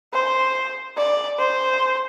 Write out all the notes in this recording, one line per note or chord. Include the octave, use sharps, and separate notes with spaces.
C5
D5
C5